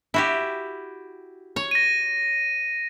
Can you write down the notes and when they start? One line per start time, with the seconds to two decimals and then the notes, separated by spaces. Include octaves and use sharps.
0.14 E4 F#4 G4
1.56 C#5
1.71 A#6 D#7